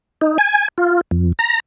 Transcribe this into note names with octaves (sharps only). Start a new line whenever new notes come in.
D#4
G#5
F4
F2
A#5